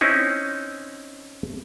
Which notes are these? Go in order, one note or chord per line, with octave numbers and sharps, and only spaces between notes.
C4 C#4 D#4 E4